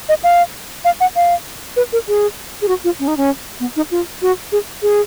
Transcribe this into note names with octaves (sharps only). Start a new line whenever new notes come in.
D#5
F5
F5
F#5
F5
B4
A#4
G#4
G#4
F#4
F4
C#4
D#4
C#4
B3
D#4
F4
F#4
G#4
G#4